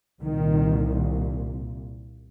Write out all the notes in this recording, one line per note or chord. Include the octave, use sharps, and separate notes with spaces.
C2 A#2 D#3